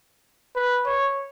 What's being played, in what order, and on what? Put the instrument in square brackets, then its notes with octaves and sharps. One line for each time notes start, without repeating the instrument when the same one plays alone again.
[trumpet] B4
C#5